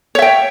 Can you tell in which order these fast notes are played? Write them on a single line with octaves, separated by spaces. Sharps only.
C#5 E5 G5